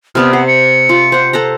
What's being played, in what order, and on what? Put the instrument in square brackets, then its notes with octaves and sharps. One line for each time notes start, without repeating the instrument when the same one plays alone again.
[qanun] C3 B3 D5 [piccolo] F6
[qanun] C5 [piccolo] F#5
[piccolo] C#7
[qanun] F4
C5 F#5
A4 F#5 A#5